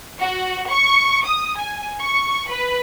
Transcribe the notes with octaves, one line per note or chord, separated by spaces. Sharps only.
F#4
C#6
D#6
G#5
C#6
B4